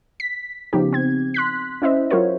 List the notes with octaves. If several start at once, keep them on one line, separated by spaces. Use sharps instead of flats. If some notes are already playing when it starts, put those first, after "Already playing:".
B6
C#3 F3 B3 D#4 G4
C4 G#6
C6 F#6 B6
C#4 E4 C5 D#5 E5
F#3 F4 F#4 A#4 C5 C#5